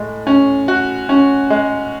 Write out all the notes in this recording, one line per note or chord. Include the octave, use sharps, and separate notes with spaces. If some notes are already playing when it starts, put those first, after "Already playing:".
Already playing: A2 G#3
C#4
F#4
C#4
G#3